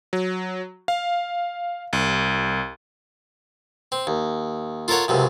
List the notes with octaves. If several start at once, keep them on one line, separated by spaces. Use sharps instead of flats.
F#3
F5
C2
C4
D#2
F4 A4 A#4 C#5 F#5
C#2 F#2 C3